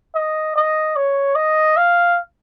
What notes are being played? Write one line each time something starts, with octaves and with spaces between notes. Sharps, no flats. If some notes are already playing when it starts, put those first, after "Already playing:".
D#5
D#5
C#5
D#5
F5